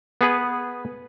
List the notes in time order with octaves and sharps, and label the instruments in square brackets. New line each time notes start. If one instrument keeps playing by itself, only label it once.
[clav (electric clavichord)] B3 G#4 B4